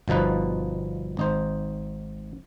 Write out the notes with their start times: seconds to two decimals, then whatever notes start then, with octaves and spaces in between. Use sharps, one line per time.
0.08 G1 B2 F3 D#4 B4
1.17 G#1 D#4 C5